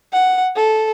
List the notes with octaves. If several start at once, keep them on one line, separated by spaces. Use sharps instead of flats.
F#5
A4